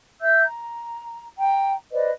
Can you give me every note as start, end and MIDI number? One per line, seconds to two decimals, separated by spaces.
0.21 0.43 76
0.21 0.43 88
0.21 0.43 91
0.44 1.26 82
1.39 1.73 79
1.39 1.73 82
1.91 2.09 71
1.91 2.09 72
1.91 2.09 74
1.91 2.09 75